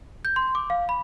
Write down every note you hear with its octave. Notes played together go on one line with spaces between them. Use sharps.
G6
C6
D6
F5
B5